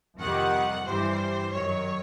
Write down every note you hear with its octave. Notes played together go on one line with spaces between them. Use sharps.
F2 C3 D#3 G3 F#5
G2 E3 G3 C5
F#2 D#3 F#3 C#5